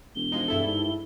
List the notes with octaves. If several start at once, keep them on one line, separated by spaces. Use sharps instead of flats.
E1 G7
F3 G#3 D#4
G2 E4 A4
G#2